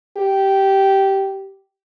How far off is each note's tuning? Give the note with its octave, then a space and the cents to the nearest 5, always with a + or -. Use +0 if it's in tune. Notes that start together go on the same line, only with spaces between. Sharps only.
G4 -10